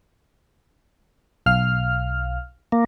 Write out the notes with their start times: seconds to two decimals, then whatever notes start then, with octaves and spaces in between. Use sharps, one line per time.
1.46 B1 F5 F6
2.72 A#3